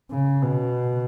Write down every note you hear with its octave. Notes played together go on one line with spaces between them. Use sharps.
C#3
B2